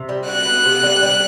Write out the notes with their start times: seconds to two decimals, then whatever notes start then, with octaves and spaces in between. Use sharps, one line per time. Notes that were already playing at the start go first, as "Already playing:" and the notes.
Already playing: C3
0.09 G3
0.27 F#4 F#6
0.46 B3
0.65 C3
0.83 G3
1.03 G3